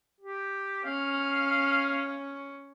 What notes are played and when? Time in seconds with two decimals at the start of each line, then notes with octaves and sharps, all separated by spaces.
0.21 G4
0.85 C#4 F5